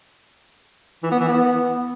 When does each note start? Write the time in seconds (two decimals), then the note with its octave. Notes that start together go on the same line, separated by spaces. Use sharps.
1.03 E3
1.12 B3
1.20 E3
1.28 B3